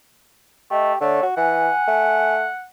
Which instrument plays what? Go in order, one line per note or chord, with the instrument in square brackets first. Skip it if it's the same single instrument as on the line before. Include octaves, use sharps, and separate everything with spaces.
[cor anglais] A3 [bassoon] G4 [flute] D#5
[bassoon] D3 [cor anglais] A3 [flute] C#5
[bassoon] F#4
[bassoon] E3 [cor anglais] F#5 [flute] G#5
[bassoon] A3